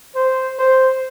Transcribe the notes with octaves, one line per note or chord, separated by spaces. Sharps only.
C5
C5